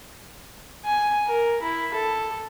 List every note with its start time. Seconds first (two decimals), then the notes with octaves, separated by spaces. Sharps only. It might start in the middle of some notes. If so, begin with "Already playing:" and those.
0.86 G#5
1.27 A#4
1.62 E4
1.94 A4